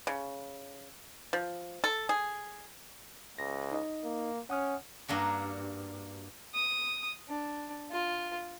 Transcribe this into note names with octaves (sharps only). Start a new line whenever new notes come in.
C#3
F3
A4
G#4
C#2 A#6
D#4 D#5
A#3
C#4 F#5 D#6 F6
G2 A#3 D4 F#4
D#6
D4
F4